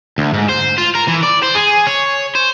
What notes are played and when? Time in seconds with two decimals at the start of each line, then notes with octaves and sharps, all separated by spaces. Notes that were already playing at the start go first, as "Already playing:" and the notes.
0.18 D2
0.34 G#2
0.49 C5
0.78 F4
0.95 A#4
1.07 E3
1.23 D5
1.42 C5
1.55 G#4
1.87 C#5
2.35 C5